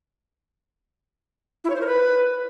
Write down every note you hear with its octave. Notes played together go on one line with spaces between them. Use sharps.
E4
C#5
C5
A#4
B4